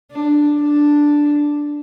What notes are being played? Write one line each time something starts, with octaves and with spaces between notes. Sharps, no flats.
D4
D4